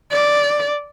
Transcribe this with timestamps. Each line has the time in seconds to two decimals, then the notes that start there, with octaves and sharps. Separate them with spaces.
0.12 D5